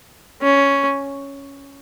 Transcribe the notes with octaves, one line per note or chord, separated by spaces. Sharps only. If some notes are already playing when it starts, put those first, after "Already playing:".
C#4